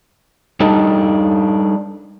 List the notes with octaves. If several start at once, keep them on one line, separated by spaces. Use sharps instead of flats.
G3 D4 D#4 A4